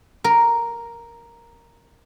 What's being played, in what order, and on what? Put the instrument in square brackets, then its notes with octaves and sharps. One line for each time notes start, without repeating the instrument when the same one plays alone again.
[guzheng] A#4